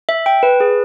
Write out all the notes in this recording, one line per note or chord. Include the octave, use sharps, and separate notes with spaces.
E5
G5
B4
G#4